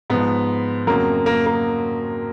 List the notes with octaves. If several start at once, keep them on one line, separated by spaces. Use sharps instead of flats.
G#2 F3 B3
F2 C#3 F#3 A#3
A#3
A#3